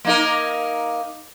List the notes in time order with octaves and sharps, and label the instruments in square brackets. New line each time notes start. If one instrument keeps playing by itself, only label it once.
[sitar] A#3 D#4 A#4